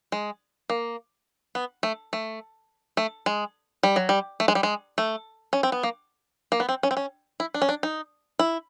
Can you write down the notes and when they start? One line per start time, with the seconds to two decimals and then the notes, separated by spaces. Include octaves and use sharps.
0.12 G#3
0.70 A#3
1.55 B3
1.83 A3
2.13 A3
2.97 A3
3.26 G#3
3.83 G3
3.96 F#3
4.09 G3
4.40 A3
4.48 G#3
4.55 G3
4.63 G#3
4.98 A3
5.53 C#4
5.63 C4
5.72 B3
5.83 A#3
6.52 A#3
6.60 B3
6.69 C4
6.83 C#4
6.91 C4
6.97 C#4
7.40 E4
7.54 D4
7.62 C#4
7.69 D4
7.83 D#4
8.39 E4